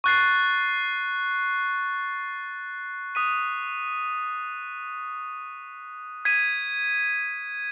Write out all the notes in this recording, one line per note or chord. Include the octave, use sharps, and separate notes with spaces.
C#6 F#6 A6 C7
D#6 F#6 B6 D#7
G#6 B6 D#7